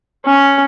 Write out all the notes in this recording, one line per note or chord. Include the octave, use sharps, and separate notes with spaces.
C#4